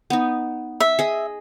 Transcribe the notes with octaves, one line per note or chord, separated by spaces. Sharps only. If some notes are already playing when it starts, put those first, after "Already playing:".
B3 D#4
E5
G#4 D#5